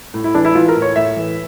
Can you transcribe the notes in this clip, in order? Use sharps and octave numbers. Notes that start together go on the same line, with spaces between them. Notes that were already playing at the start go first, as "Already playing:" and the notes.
A2
E4
E3 D4
E4
E3 F4
A#4
A2
C#5
A2 E5
E3